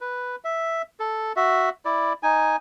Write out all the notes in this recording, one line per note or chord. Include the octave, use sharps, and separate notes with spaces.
B4
E5
A4
F#4 E5
E4 D5
D#4 G#5